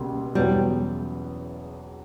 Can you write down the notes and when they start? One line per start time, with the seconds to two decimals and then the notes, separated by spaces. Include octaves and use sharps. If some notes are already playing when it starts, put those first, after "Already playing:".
Already playing: C#2 B2 G3 A#3
0.35 E2 B2 F#3 G3 B3 E4